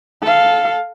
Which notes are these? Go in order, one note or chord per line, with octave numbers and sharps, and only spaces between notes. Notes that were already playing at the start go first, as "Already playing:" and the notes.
A4 F5